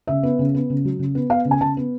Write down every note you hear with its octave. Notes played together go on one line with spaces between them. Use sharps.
C#3 E5
B3
C#3
B3
C#3
F#3
C#3
B3
B3 F5
C#3
G#5
C#3 A5
B3